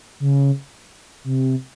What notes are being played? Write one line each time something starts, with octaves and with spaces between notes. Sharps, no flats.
C#3
C3